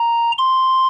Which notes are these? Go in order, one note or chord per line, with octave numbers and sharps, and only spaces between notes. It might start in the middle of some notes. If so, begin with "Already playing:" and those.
Already playing: A#5
C6